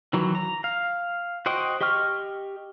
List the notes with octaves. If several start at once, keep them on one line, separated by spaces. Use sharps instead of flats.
D#3 E3 F#3
A#5
F5
F#4 C5 D#5 G5
G4 D#5 G5 C#6 F6